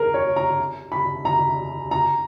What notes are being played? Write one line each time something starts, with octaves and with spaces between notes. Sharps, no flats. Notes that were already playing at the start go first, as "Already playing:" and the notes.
Already playing: G#4 A#4
C#5
A#5
B5
A#5
A#5